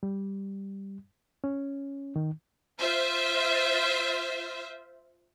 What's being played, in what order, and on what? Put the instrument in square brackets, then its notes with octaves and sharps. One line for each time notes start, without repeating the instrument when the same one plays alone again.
[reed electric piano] G3
C#4
D#3
[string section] F4 C5 E5